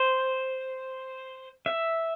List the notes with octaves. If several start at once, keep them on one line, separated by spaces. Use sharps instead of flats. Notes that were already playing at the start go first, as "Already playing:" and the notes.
Already playing: C5
E5